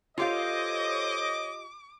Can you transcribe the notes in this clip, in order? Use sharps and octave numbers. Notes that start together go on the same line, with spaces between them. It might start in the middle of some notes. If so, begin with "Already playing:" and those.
F4 G4 A4 C5 C#5 D#5 F5 D6